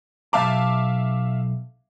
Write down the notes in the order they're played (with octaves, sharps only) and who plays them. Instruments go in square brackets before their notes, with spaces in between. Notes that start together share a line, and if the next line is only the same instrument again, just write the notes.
[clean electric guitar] B1 G#3 A5 [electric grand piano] E5 F5 D6